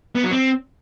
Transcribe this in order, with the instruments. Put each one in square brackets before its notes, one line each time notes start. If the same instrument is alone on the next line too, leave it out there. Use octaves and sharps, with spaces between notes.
[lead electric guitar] B3
F#3
C4